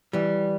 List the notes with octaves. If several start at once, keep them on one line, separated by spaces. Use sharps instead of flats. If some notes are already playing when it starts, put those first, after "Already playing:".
E3 G3